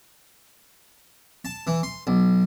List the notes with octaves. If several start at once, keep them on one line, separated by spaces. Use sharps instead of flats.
A5
E3
C6
B1